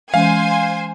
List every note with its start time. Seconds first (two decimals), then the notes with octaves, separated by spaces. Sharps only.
0.14 E3 G#3 C#4 C5 F5 G#5